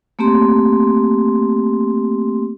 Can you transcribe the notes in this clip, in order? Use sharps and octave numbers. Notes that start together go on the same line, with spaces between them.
A3 A#3 C4 G4 C6